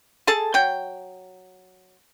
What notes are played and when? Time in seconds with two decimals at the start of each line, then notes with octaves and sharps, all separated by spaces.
0.27 G#4 A4 A5
0.54 F#3 G5